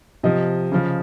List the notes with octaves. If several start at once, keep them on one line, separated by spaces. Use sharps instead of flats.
C3 F3 D#5
C#3 F3